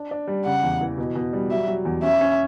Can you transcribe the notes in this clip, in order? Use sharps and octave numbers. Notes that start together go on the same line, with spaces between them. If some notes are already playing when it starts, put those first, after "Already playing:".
Already playing: D4
D4
G3
C#3 F#5
E2
E3
B2
B2
G3
F#3 E5
F#3
E2
C#4 E5
C#4